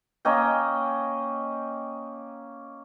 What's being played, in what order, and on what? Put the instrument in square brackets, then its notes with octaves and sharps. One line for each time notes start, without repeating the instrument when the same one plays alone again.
[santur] A#3 C#4 D#5 G5